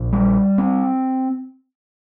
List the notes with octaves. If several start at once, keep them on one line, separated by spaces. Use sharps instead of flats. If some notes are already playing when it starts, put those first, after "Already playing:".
Already playing: A#1
G3
C4